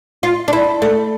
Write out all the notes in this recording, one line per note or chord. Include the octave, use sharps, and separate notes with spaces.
F4
D4
E4
A3